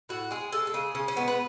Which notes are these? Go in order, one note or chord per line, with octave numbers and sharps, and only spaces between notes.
A2 F#4
G#3 G#4
G#3 A4
A4
C#3 G#4
C#3 C#4
C#4
G#3 B3
B4